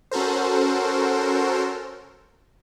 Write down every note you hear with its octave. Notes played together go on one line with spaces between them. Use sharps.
C#4 F#4 A4 A#4 C5